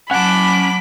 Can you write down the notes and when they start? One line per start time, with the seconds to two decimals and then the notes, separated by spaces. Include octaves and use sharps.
0.11 F#3 C#4 F#5 A5 B5 D6